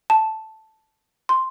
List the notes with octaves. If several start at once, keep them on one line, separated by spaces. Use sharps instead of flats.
A5
C6